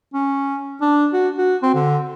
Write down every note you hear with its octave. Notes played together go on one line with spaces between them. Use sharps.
C#4
D4
F#4
F#4
C4
D3